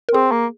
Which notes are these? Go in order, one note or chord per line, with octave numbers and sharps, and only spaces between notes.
A#4
C4 G#4
A#3